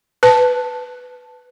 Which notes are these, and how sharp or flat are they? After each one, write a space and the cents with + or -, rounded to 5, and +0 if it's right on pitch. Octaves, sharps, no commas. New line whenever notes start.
B4 +10 A5 +0